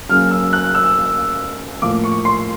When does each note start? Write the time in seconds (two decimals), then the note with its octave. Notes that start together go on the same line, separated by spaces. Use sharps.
0.09 C#3 F#3 A#3 C#4 F6
0.31 E6
0.53 F#6
0.75 E6
1.82 A2 F3 A#3 D6
2.04 C#6
2.25 C6